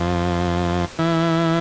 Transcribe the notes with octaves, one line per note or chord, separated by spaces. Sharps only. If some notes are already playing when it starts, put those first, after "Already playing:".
Already playing: F2
E3